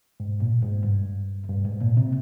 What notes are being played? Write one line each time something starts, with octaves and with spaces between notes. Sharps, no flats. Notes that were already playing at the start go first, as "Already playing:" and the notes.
G#2
A#2
G#2
G2
G2
G#2
A#2
C3